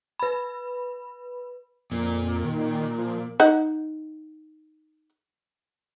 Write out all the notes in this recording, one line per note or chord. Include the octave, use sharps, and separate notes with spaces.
B4 B5
F2 A#2
D#3
F3
D#4 F#5